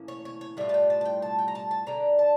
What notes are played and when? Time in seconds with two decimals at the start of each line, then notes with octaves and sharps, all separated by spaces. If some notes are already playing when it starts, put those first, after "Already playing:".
Already playing: A2 E3 A#3 C#4
0.08 C#5
0.25 C#5
0.41 C#5
0.57 A2 G3 D4 F4 E5
0.69 A5
0.74 G5
0.90 A5
1.01 A5
1.05 G5
1.22 A5
1.38 G5
1.48 A#5
1.55 A5
1.71 A5
1.86 D3 G3 D4 A#5
2.19 A5